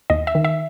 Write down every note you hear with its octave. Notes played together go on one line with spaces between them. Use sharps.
D#2 D#5
E5
D#3
E5